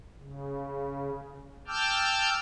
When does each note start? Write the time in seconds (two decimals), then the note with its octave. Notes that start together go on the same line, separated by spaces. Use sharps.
0.18 C#3
1.68 G5 A5 D6 E6 F6 G6